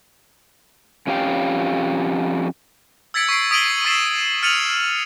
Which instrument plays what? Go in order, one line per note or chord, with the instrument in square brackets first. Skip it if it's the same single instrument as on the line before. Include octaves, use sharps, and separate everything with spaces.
[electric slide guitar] F2 C#4 G4 F5 G5
[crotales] E6 G#6 A6 B6 C#7 D7
C#6 B6 C7 D7
D#6 B6 D7 D#7 F#7 G7
C#6 E6 A6 B6 C7 E7
F6 A6 C#7 D#7 F7 F#7